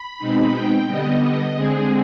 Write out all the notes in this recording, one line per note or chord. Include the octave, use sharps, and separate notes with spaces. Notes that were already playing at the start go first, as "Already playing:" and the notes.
Already playing: B5
B2 G#3 C4 D#4
G5
D3 G3 B3 D#5
D#5
D3 G#3 C4 G#4